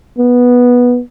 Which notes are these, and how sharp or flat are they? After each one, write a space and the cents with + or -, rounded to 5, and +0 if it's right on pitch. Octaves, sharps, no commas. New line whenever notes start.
B3 -10